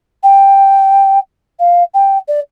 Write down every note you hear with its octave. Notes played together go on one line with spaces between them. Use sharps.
G5
F5
G5
D5